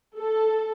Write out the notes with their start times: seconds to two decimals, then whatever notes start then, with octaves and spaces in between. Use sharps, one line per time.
0.18 A4